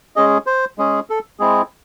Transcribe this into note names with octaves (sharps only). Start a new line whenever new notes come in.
G#3 C#4 G#4 D#5
C5
G#3 C#4 G#4
A4
G#3 C4 E4 G#4